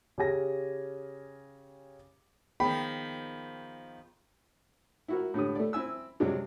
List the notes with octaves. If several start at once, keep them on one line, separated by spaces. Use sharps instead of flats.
C#3 G4 G#5 A#6
D#3 F3 B3 G#4 A#4 G5 B5
E4 F#4 A#4
A2 D3 G4 D#6
A3 D5
C4 E4 G#5 E6
G2 C3 F#3 G#3 D4